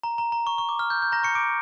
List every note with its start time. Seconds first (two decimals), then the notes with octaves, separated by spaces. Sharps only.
0.03 A#5
0.18 A#5
0.32 A#5
0.47 C#6
0.58 C#6
0.69 D6
0.79 F6
0.90 G6
1.02 G6
1.12 A#5 A#6
1.23 C#6 C#7
1.35 D6 D7